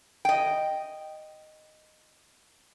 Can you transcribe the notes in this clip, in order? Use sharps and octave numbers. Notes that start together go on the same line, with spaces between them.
D#5 G5